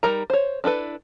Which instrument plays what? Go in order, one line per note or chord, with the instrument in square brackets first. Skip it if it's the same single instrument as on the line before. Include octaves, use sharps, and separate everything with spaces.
[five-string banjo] G3 D#4 A#4 A#5
C5 C#5
D4 E4 A4 B4